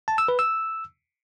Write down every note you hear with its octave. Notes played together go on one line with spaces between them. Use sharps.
A5
E6
B4
E6